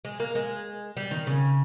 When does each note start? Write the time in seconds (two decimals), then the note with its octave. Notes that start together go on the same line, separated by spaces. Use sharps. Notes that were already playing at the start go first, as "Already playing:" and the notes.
0.05 G#3
0.20 A#3
0.35 G#3
0.97 G3
1.11 D#3
1.27 C#3